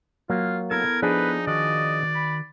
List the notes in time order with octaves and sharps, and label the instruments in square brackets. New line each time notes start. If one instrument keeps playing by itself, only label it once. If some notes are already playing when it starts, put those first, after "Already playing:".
[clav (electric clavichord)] F#3 A#3 [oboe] F4
[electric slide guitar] B3 E4 A4 [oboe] A#4 [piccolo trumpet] G#6
[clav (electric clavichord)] F3 D4 G#4 [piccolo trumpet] D#4 [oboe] B4
[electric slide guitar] D#3 F#4 [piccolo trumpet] D5 [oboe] D#5
[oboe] B5